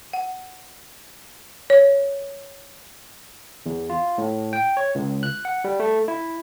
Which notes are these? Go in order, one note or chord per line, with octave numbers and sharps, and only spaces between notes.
F#5
C#5
E2
F4
A2
G5
C#5
C#2
F#6
F#5
G3
A3
E4